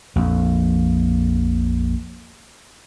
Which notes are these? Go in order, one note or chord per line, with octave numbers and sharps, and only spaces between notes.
A#1 F2